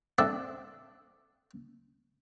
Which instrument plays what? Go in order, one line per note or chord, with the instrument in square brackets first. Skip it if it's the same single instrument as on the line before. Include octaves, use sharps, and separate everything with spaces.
[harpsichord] C4 D4 A4 D5 E5 F#5